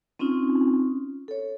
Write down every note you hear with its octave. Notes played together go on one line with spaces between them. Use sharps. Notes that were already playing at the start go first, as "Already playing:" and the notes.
C4 C#4 D#4 F4
A4 C#5